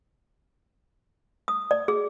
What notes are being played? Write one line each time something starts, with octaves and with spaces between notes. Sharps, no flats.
D#6
D5
G#4